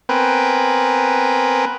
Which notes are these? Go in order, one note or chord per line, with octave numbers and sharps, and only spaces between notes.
B3 C4 A#4 B4 G5 G#5